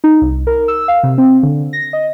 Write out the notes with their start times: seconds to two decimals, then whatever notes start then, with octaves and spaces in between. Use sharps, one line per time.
0.04 D#4
0.22 C2
0.47 A#4
0.68 E6
0.88 F5
1.03 C3
1.18 C4
1.43 D3
1.73 A#6
1.93 D#5